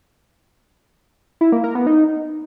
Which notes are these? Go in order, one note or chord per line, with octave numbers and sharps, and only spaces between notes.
E4
A#3
A#4
B3
D#4